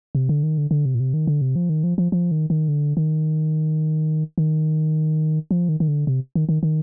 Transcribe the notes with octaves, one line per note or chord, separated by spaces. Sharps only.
C3
D3
D#3
D3
D3
C3
A#2
C3
D#3
D3
C3
F3
D#3
F3
F3
F3
D#3
D#3
D3
D#3
D#3
F3
D#3
D#3
D3
C3
D#3
D#3
D#3